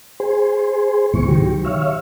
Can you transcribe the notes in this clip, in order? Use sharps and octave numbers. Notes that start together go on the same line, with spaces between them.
G#4 C5
C#2 G#2 B2 E3 C#6
D#3 F#3 G4
C#5 E5 F5